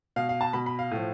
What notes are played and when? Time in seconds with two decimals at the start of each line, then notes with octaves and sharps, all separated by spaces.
0.16 B2 F5
0.29 F5
0.41 A5
0.53 B2 B5
0.66 B5
0.79 F5
0.91 A2 F3